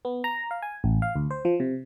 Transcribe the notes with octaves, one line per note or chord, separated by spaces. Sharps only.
B3
A#5
F5
G#5
A1
F5
D2
C5
F3
C3